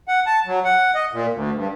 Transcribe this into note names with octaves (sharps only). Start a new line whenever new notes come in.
F#5
A5
F#3
F#5
D#5
A#2
D2
G2